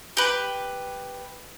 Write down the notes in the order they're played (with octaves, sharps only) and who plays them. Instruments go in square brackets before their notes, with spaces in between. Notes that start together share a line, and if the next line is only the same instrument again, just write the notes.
[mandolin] G4 B4